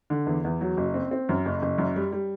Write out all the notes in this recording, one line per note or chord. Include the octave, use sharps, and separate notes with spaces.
D3
E2
E2
F#3
F#1
C4
C4
F#2
F#1
F#1
F#2
G3
G3